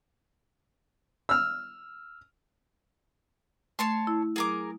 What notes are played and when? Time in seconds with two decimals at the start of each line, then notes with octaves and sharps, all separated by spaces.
1.29 E6 F6
3.79 A3 C#5 A5 C6
4.07 E4
4.36 F#3 G#4 A#4 D6